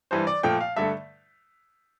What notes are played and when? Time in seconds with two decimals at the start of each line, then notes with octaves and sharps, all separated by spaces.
0.11 G2 E3 G3 C5
0.27 D5
0.43 A#2 F3 A3 G5
0.61 F5
0.76 G2 D3 A3 E5